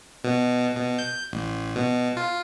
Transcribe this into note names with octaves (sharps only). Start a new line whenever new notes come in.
B2
B2
G6
A1
B2
F4